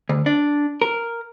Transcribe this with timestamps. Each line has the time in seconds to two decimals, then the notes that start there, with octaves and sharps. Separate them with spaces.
0.09 D2
0.26 D4
0.82 A#4